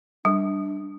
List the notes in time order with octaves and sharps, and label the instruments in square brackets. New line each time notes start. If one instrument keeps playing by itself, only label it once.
[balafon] G3 [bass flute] D4